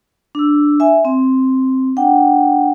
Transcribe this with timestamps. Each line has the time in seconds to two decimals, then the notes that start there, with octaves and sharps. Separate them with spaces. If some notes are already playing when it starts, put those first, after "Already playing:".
0.35 D4 E6
0.80 E5 G#5
1.05 C4
1.97 D4 F#5 G5